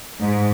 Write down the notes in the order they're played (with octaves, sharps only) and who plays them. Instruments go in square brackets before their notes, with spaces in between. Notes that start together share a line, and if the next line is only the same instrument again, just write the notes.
[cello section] G#2